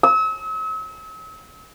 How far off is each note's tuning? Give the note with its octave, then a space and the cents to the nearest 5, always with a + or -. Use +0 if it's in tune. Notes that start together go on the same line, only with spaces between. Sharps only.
E6 -40